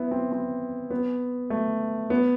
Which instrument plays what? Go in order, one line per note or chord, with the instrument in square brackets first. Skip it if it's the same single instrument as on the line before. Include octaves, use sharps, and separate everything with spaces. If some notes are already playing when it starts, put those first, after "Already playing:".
Already playing: [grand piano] B3 E4
C4
C4
B3
A3
B3